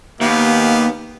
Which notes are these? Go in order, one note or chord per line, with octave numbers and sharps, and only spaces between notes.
D#2 B3 G4 F5